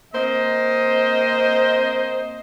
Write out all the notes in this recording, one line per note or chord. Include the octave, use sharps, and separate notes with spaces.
A#3 C4 C5 D#5